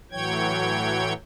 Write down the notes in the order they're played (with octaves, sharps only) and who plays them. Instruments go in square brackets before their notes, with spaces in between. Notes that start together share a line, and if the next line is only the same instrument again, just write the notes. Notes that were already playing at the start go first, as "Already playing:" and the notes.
[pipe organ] A2 E3 F#3 C#5 G5 G#6